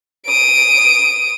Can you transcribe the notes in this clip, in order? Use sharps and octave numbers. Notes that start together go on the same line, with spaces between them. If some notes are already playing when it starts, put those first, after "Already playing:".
D#6 D7